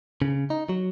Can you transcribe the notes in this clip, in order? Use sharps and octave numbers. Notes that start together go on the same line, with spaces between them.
C#3
D#4
F#3